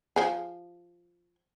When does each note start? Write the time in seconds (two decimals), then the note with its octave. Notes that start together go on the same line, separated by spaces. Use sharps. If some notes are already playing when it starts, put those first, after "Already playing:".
0.16 F3 G#4